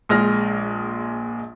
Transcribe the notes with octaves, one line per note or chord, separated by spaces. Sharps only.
A#1 G#3 F6 A#6